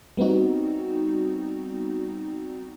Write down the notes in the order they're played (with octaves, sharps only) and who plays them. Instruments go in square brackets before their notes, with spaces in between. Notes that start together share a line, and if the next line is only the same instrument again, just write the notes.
[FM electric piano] G3 B3 C4 D#4 F#4